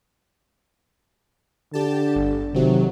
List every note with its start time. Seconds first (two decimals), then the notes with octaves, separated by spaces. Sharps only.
1.74 D3 G4 A5
2.16 G1
2.54 C3 D#3 F#3